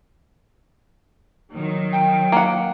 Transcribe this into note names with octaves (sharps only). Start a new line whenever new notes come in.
D#3 F#3
G5
A#3 F#5